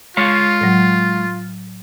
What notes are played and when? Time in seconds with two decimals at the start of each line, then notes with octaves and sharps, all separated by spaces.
0.17 G#3 F4 C#5 F5
0.61 A2 F#3